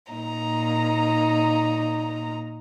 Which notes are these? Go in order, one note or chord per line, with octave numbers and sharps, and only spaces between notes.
A#2 D#4 A#5